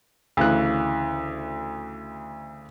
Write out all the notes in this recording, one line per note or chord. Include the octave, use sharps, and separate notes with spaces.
D2 C#3 E3 F#6